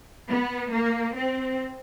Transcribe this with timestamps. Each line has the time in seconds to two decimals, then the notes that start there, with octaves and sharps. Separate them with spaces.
0.28 B3
0.72 A#3
1.16 C4